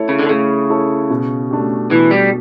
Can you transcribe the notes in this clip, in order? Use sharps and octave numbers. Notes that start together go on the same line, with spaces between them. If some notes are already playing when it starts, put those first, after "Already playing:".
Already playing: A3 E4 A4 C#5
C#3
D3
C#3 A3
E4 A4 C#5
B2
A3 D4 G4
B2 E3
G3